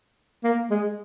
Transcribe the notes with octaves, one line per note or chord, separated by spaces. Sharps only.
A#3
G#3